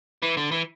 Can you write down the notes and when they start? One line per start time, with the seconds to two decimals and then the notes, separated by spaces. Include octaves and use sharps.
0.22 E3
0.37 D3
0.52 E3